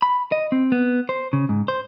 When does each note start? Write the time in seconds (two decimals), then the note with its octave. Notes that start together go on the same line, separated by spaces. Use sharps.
0.02 B5
0.32 D#5
0.52 C4
0.72 B3
1.09 C5
1.33 C#3
1.49 G#2
1.68 C5